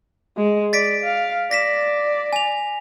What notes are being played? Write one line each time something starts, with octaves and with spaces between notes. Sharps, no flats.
G#3
D5 A6 B6 D7
F5
D5 A#6 B6 E7
G#5 F7